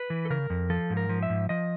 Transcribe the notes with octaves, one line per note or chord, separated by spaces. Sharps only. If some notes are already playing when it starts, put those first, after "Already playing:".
Already playing: B4
E3
A4
C#3 A#4
F2
F3 A4
G#2
A#4
F3
E5
G#2
F3 D#5